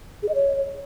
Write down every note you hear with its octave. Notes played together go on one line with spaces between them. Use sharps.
G#4
D#5
C#5